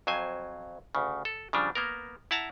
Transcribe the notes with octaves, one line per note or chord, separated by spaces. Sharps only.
F2 F#3 C5 G#5
D2 C#3
A4
C#3 F3 G3 D4
A#3 B3 A#4
E4 F#5 A5 A#5